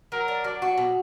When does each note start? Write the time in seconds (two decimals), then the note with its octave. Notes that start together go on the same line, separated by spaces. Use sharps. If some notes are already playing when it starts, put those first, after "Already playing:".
0.12 F#3 A#4
0.28 D4
0.44 F#3 D5
0.62 F#4
0.77 B2